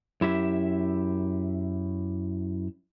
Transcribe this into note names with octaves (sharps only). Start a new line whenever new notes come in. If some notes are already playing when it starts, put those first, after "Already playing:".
F#2 E4 G4 E5